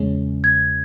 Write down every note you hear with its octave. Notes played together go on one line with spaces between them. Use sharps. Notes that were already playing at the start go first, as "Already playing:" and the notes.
Already playing: E2 C#3 G#3 C#4
G#6